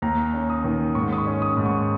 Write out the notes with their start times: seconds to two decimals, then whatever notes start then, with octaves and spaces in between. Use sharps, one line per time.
0.02 D#2 A#5
0.34 C#4
0.50 D#6
0.65 D#3
0.95 G#2 C#6
1.13 D#6
1.18 C#6
1.26 C#4
1.42 D#6
1.57 G#2
1.66 C#6